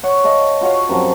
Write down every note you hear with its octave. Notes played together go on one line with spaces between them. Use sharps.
C#5 F#5
D#5 F5 A5
F4 F#4 C#5 F5
F#2 C3 F3 F#3